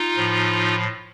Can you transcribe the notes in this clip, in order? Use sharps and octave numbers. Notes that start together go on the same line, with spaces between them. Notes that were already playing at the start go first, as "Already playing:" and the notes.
Already playing: D#4 F4
A2 F3